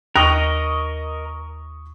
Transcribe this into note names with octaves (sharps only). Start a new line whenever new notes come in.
D#2 A#4 D#5 C#6 D#6 A#6